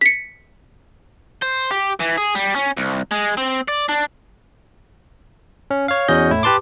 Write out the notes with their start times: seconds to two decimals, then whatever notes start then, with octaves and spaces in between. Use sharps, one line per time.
0.01 B6 C#7
1.42 C5
1.71 G4
2.00 E3
2.17 G#4
2.35 G3
2.55 C#4
2.77 C2
3.11 G#3
3.37 C4
3.68 D5
3.89 D4
5.71 C#4
5.88 C#5 F5
6.08 E2 C#4 F#4 D#5 G6
6.31 A2 E4
6.43 G4 B4 A5 C6 D6